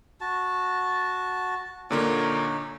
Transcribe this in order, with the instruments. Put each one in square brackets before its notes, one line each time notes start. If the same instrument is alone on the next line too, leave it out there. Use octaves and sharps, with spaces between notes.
[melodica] F#4 A5
[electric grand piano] A#2 D3 A#3 [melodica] D#4 C#5